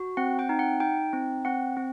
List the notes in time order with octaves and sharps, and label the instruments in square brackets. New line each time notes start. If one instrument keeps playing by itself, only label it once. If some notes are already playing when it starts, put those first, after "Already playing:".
Already playing: [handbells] F#4
C4 F#5
G5
D#4
F#5
D#4 G5
C4
C4 F#5
C4